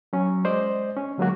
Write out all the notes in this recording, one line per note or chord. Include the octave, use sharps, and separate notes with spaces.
F#3 C#4
G#3 C5 D5 D#5
C#4
D3 F#3 G#3 A#3 F#4